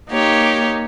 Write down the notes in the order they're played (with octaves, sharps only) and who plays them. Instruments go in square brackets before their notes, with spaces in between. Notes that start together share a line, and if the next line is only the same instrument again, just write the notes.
[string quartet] A#3 D#4 G4 C#5